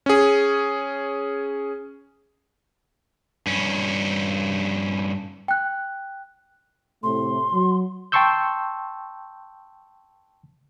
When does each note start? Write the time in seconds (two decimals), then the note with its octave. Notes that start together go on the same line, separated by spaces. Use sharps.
0.06 C#4 G#4
3.47 G2 C#4
5.48 G5 F#6
7.03 A2 C3 A3 C6
7.52 F#3
8.12 G5 A5 C6 C#6 E6 G6